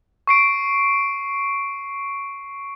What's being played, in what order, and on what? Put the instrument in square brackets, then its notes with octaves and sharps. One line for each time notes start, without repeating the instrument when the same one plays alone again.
[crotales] C#6 C7 D7